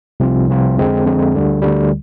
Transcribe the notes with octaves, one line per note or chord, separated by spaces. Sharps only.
C2 C3 F3 C4 F4
C2 C3 F3 C4 F4
F2 D3 G#3 C4
F2 D3 G#3 C4
D2 D3 G3
D2 D3 G3